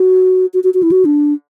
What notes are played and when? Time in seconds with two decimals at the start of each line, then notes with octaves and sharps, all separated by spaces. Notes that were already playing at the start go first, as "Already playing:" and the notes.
Already playing: F#4
0.54 F#4
0.64 F#4
0.74 F#4
0.83 E4
0.92 F#4
1.05 D4